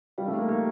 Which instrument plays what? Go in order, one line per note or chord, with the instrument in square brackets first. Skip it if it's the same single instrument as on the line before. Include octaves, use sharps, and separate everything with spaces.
[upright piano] G3 [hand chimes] F5
[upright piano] A3
[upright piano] A#3 [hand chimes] D#4
[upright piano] A#3 [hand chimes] G4